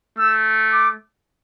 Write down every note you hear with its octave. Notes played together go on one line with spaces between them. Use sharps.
A3 E6
D6